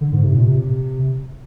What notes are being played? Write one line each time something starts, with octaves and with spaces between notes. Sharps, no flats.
D3
G#2
C3
A#2
C3